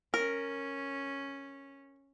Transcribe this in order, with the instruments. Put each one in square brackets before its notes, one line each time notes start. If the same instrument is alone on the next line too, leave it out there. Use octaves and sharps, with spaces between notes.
[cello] C#4 [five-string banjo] A#4